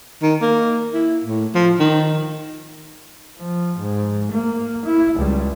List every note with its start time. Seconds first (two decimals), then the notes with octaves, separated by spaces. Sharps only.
0.23 D#3
0.42 A#3
0.94 E4
1.25 A2
1.55 F3
1.80 D#3
3.39 F3
3.79 G#2
4.32 A#3
4.85 E4
5.15 C#2 G3